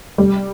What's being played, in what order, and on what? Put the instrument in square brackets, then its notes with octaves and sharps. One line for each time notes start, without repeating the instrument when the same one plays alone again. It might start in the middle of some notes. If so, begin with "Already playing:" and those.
[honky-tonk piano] G3